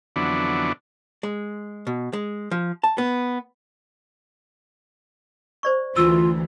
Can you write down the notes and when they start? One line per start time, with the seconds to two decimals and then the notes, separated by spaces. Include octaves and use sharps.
0.16 F2 D3 E3 F#3 B3 D4
1.23 G#3
1.87 B2
2.13 G#3
2.51 F3
2.83 A5
2.98 B3
5.63 C5 D5 C#6
5.97 D2 E3 F4 E6